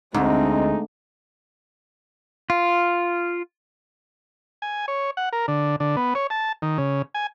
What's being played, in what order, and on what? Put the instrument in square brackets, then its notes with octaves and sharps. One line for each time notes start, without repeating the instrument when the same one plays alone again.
[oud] D2 [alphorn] G#3 [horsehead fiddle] C4 [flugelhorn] D#4
[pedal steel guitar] F4
[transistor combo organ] G#5
C#5
F#5
A#4
D3
D3
B3
C#5
A5
D#3
C#3
G#5